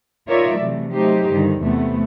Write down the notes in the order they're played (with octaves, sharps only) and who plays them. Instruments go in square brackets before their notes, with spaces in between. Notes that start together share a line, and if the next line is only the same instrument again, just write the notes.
[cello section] D#4 F4 A#4 C#5 D5 E5
C3 E3 F#3 A3
F#3 A3 D#4 G4 C5
G2 D3 D#3
E2 C3 A3 B3